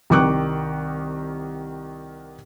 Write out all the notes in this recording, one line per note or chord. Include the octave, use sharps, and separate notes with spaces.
C2 D#3 G5 C#6 D6 F#6